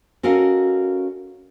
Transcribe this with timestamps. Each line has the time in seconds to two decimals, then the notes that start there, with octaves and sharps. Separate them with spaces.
0.23 C#4 F#4 A4 A#4 D#5 F5